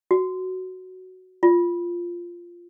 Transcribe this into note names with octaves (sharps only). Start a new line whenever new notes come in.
F#4
F4